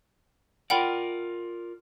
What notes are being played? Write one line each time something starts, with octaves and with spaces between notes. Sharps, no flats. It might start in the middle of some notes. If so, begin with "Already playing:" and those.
F4 A#4 D5 F#5 G5 B5